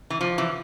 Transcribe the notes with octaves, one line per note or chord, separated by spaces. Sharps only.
E3
F3
E3